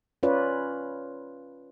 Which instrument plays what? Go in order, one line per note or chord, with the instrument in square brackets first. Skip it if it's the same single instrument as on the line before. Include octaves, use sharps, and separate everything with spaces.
[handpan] C#4 F4 B4 C#5 D5